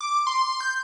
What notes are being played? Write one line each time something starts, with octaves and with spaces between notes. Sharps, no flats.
D6
C6
G6